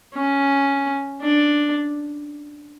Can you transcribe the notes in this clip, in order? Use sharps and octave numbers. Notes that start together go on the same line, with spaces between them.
C#4
D4